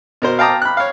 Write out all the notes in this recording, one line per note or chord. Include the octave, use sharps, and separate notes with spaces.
B2 A#4 C5
F5 G5 A5 A#5 D6 D#6
B5 F#6
C#5 F5